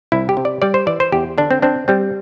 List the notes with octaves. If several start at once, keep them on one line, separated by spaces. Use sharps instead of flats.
C2 E4
G4
C3
D5
G3 D5
C5
E3 D5
C5
E2 G4
D3 D4
C4
C4 D4
G3 C4